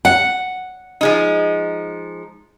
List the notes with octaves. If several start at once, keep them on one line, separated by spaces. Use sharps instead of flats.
F#5
F3 G#3 D#4